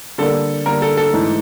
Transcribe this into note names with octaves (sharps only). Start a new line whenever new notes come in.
D3 G3 A#3 A4
D3 G3 A#3 A#4
A4
A4
G#2 E3 A3